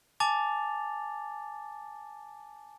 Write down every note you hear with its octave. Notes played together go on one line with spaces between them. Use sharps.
G#5 A5 D6 A6 F7